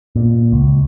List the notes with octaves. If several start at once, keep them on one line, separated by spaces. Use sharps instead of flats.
A#2
C#2